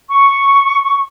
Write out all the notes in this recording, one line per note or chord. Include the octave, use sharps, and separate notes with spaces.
C#6